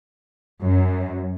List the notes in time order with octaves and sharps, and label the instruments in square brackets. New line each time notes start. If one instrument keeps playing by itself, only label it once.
[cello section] F#2